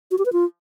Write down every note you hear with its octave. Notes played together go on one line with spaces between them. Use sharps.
F#4
G4
B4
F4